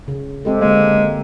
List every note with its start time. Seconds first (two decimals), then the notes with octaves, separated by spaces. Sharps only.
0.08 C#3
0.45 G#3 C4 G4 A4
0.61 D3 G#3 A#3